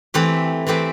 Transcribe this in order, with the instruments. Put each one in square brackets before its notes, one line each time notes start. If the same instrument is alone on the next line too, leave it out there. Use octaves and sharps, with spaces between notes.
[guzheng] E3 A3 C4 G4 B4
E3 A3 C4 G4 B4